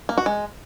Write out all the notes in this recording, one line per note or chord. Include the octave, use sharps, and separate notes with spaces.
A#3
F#4
G#3